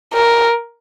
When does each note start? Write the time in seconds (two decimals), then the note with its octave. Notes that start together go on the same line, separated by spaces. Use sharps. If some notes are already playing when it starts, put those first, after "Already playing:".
0.14 A#4